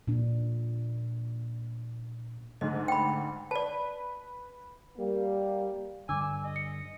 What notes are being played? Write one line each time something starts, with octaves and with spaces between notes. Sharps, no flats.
A#2 D4
D2 G#2 D3 D#5
G5 B5
B4 D5 A5
G3 A#3
G2 D3 G#5 D6 E6
G#5 E6
D#5
C#7